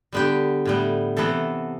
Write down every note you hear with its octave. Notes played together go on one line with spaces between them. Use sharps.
D3 G3 B3 G4
A2 G3 B3
C3 E3 B3 A4